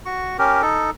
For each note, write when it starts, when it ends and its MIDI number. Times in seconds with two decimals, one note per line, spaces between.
0.06 0.37 66
0.06 0.37 85
0.39 0.62 61
0.39 0.62 67
0.39 0.62 70
0.62 0.90 63
0.62 0.90 69